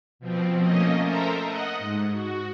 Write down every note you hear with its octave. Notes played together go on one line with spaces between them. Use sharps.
B2 F3 C4
A3 A#3 C#4 D#5
A4 A#4 C5 E5 A#5
D#5 F#5
G#2
F#4